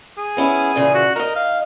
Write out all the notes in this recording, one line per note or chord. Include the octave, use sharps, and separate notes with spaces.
G#4
B3 C#4 E4
A#2 C#3 E3
F#4
D#4 A#4 D#5
F5